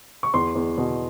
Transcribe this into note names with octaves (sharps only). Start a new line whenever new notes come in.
C#6
E2 C6
E2
B2